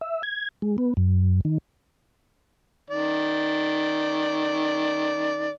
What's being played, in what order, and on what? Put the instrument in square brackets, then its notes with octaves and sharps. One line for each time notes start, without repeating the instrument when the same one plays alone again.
[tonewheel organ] E5
G#6
G#3
B3
F#2
D#3
[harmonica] D#3 D5